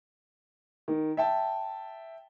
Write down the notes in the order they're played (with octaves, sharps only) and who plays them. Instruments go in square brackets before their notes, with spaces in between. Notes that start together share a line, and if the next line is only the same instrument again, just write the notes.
[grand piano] D#3
E5 G5 A5